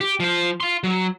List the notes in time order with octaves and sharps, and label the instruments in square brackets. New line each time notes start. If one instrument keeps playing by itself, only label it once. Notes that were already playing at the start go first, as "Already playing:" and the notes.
[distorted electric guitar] G4
F3 C5
F5 C6
F#3